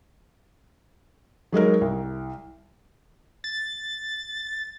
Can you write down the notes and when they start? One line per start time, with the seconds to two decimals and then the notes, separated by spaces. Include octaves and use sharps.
1.52 F#3 G#3 D#4 A#4
1.81 C2
3.44 A6